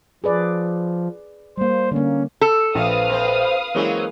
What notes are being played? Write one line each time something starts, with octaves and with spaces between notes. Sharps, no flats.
F3 G#4 B4 D5
G3 A#3 C5
D3 A#3 C#4
A4
A#1 C4 B4 F5 D#6
C4 C5
E3 F#3 G#3 A#3 C4 C#4